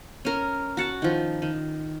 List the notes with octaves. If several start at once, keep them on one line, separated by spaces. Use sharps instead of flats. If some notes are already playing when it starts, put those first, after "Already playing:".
C#4 A#4
F#4 F#5 A5
D#3 F3
D#3